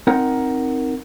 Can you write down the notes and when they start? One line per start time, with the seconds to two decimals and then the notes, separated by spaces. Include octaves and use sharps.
0.07 C4 D#4 A#4 F#5